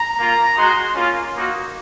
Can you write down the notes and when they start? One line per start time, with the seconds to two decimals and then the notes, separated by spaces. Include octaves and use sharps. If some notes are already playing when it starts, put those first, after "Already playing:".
Already playing: A#5
0.18 A#3 F4
0.56 G#3 D#4 F#4 C6
0.95 A#3 C#4 F4
1.34 A#3 D#4 F#4